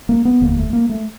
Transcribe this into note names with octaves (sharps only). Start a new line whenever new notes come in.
A#3
B3
F1 D#2 D3 A#3
A3
A#3
A3